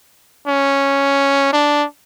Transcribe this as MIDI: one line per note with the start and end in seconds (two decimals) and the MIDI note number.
0.47 1.52 61
1.53 1.85 62